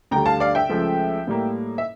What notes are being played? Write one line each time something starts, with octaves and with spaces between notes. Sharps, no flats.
D2 D3 G3 G5 A#5
F5 A5
D5 F5
E5 G5
C#2 C#3 F3 A3
A2 G3 A#3
E5